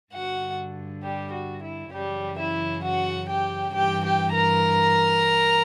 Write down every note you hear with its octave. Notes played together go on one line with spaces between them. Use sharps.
G2 D3 F#4 F#5
G3 G4
F#4
E4
F#2 C#3 E3 G3 G4
E4 E5
F#4 F#5
G4 G5
G2 E3 G4 G5
G4 G5
A#4 A#5